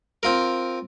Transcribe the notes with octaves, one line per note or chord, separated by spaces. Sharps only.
C4 F4 A#4